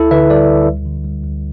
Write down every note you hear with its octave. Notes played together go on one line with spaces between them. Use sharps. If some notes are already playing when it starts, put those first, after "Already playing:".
Already playing: D2 E4 A4
D3 B4 E5
G3 A4 D5
D2
D2
D3
G3
D2